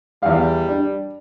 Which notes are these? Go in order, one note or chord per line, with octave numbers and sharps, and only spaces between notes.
E2 G3 F5
D4